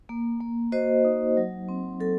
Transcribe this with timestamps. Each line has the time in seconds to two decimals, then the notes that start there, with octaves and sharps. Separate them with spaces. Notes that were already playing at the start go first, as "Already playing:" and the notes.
0.09 A#3
0.41 A#3
0.72 F#4 C5 D#5
1.05 D#4
1.37 F#3
1.69 C4
2.00 F#3 A4